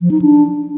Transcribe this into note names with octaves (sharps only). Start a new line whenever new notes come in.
F3
D#4
D4